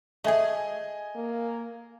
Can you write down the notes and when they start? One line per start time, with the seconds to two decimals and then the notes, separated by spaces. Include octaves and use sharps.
0.24 A3 G#4 D#5 G#5
1.15 A#3